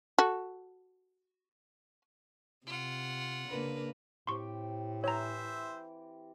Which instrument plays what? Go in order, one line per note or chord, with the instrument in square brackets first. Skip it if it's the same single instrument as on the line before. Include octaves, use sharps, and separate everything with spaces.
[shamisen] F#4 A4
[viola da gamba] C3 [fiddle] F4 F#5
[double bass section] C#3 A#3 [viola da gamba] D4 A#4 B4
[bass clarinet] A2 [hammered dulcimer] C4 G4 G5 [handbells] C6 C#6
[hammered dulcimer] E3 [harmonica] C5 E5 [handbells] C#5 A#5